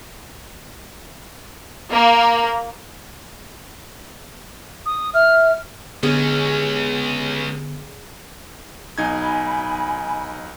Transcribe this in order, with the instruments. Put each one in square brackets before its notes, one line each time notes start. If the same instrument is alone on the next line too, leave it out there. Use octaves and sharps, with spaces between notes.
[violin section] A#3
[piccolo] D#6
[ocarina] E5 [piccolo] F6
[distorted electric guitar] C#2 C#4 [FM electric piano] D3 B3 G4 [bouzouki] G#4
[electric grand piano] B1 D#4 G#6 [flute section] G#5 B5